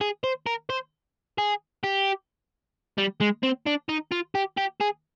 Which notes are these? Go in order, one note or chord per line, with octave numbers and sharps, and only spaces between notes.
G#4
C5
A#4
C5
G#4
G4
G3
G#3
C4
D4
D#4
F4
G4
G4
G#4